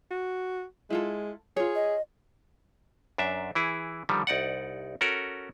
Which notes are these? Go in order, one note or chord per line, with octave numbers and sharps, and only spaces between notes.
F#4
G#3 E4 F4 A4
F4 G#4 C#5
D#5
F#2 D4 E5
E3 E4 G#4
D3 D#3 F3 G3
C2 D#4 D5 F#5
C#4 F#4 A4 A#4